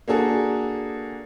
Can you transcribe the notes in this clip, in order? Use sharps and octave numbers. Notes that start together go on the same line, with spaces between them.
A#3 D4 F#4 G#4 A4